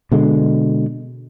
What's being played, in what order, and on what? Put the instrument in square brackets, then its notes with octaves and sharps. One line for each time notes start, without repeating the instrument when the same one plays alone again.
[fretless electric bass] B2 D3 G#3